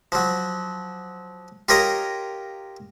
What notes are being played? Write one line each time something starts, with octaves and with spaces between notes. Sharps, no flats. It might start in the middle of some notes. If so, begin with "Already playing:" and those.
F3 F#3
F4 G4 A#4 C#5 D#5 A#5